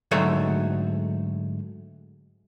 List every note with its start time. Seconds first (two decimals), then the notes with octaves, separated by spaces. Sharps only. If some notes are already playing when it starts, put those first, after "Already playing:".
0.11 G#2 D3 F#3 A3 C#5